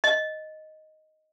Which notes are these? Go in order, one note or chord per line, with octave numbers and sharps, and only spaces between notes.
D#5